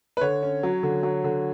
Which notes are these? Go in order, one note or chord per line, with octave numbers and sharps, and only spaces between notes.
B4
D3 C#5
C#4
F#3
D3
F#3
D3